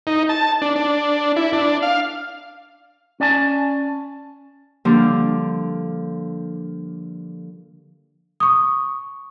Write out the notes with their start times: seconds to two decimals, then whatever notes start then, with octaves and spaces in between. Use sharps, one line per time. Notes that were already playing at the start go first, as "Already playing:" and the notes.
0.07 D#4
0.29 A5
0.62 D4
0.76 D4
1.36 E4
1.53 D4
1.82 F5
3.20 C#4 D5 G#5 A5
4.85 D3 F3 G3 A#3 D4
8.40 C#6 D#6